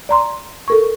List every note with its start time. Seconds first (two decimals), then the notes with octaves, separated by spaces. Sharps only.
0.09 D5 A#5 C6
0.68 A4 A#4 C#6